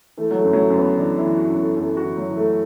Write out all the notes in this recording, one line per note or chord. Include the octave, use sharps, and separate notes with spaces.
E3 A3
F#3
A3
F#2
F#3
A3
F#2
B3
E3 D4
E4
E3
F#4
F#2
A4
F#2 A4
F#4
E3
F#3
E3
A3